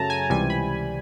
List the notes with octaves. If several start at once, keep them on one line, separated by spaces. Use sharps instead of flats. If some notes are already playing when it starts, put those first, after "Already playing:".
Already playing: F#2 C#3 F#3 A3 A5 A#5
G#5
C#2 C3 E3 G3 G#5
B5